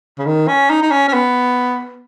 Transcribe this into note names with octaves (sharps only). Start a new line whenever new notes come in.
C#3
D#3
C#4
D#4
D#4
C#4
C#4
B3